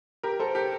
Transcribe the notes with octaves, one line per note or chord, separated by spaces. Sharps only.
G4 A#4
A4 C5
G4 A#4